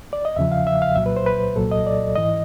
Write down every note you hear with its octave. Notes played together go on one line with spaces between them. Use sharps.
D5
D#5
E2 C#3 F3 E5
F5
E5
F5
C2 A#2 F#3 E5
B4
C5
B4
C2 A#2 F#3 A4
D#5
D5
G#2 E3 D#5